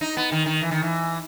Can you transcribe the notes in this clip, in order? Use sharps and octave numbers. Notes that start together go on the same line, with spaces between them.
D#4
B3
D#3
D#3
E3
D#3
E3